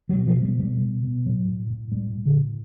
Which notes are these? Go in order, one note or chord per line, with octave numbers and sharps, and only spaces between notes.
F#3
B2
F3
B2
G3
B2 G3
B2
B2
A2 F#3
A2
A2
A2 G3
A2
D3
A2